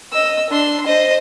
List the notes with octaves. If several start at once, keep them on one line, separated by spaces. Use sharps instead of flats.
D#5 E6
D4 C6
C5 D#5